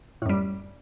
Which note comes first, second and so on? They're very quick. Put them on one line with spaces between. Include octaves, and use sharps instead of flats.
A2 F#2 G3